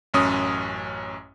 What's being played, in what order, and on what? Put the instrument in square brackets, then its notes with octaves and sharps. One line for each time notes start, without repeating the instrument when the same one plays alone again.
[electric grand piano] A1 F#2 C#4 D#6